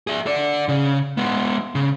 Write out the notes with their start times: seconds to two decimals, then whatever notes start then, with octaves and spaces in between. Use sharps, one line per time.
0.07 G#4 E5
0.26 A4 D5
0.68 C#3
1.17 G#3 B3
1.75 C#3